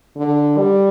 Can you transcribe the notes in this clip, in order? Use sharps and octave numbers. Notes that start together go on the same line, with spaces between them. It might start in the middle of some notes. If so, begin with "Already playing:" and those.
D3
G3